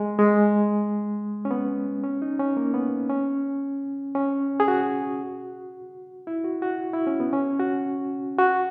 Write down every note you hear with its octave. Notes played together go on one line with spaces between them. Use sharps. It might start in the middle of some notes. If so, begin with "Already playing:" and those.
Already playing: G#3
G#3
C#4
B3
C#4
D#4
C#4
A#3
B3
C#4
C#4
G#4
F#4
E4
F#4
F#4
E4
C#4
B3
C#4
F#4
F#4